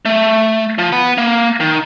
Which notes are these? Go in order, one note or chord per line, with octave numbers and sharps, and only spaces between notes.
A3
F3
B3 B5
A#3
D#3